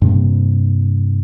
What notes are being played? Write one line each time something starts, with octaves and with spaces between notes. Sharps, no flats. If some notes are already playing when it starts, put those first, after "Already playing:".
G2 C3 A#3